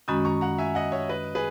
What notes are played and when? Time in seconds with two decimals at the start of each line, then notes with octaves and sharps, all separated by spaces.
0.08 F#2 D#3 G#3 C#4 F#4 B5 D#6
0.25 A#5 C#6
0.41 F#5 A#5
0.58 E5 G#5
0.75 D#5 F#5
0.92 C#5 E5
1.09 B4 D#5
1.35 G#4 B4